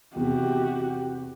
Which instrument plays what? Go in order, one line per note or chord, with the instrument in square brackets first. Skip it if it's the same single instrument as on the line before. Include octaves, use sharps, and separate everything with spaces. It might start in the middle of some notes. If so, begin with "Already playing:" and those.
[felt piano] E2 C3 [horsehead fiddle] F#4 G4